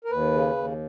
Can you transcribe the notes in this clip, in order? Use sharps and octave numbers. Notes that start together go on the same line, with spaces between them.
A#4
D#2 B4
C#3
D#2